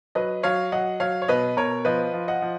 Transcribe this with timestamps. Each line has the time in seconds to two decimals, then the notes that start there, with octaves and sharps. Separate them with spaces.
0.15 F#3 B4 D#5
0.43 F#3 C#5 F5
0.72 F#3 D#5 F#5
1.00 F#3 C#5 F5
1.22 C#5
1.28 B2 B4 D#5
1.57 B2 A#4 C#5
1.85 F3 B4 D#5
2.14 F3
2.28 D#5 F#5
2.42 F3